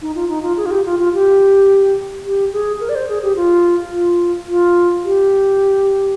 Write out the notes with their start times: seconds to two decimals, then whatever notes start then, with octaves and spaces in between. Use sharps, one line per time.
0.02 D#4
0.15 F4
0.29 D#4
0.43 F4
0.57 G#4
0.66 F4
0.71 G4
0.86 F4
0.99 F4
1.14 G4
2.25 G4
2.53 G#4
2.80 A#4
2.89 D5
2.95 C5
3.09 G#4
3.23 G4
3.36 F4
3.92 F4
4.49 F4
5.04 G4